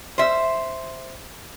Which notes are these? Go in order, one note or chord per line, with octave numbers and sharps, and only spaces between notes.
C5 E5